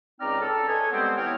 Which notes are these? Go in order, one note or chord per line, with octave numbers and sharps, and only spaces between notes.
C#2 C4 D#4 D5 A#5 F6
A4
A4 B4 C#5 D#5 G#5
G3 G#3 B3 C4
E3 B3 C#5 G5 F6